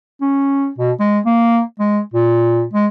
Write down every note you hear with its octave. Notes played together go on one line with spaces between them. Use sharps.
C#4
B2
G#3
A#3
G#3
A#2
G#3